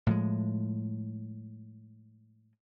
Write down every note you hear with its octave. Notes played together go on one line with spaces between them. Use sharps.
A2 F3 G#3